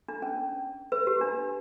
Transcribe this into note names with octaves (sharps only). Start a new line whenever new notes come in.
D4
C#4
B4
G4
D4